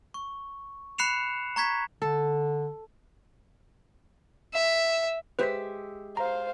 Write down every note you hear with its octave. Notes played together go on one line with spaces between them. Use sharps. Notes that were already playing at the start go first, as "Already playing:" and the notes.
C#6
B5 F#6 C7 C#7 E7 F7
A#5 C#6 G#6 B6
D3 A4
E5
G#3 G4 B4 C5 E5 B6
C5 F5 A#5